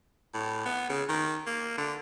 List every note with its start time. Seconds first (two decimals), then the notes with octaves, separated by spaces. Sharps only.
0.34 A2
0.66 B3
0.90 C#3
1.09 D#3
1.47 A#3
1.78 D3